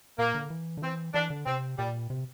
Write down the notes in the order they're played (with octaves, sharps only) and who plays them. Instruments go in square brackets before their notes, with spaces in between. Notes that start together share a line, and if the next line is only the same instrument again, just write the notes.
[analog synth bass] A#2 [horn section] A#3
[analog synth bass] D3
E3
D3
[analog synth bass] E3 [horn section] C4
[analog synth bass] E3 [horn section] D4
[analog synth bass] D3
[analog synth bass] C3 [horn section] C4
[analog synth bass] A#2 [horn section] G3
[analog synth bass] C3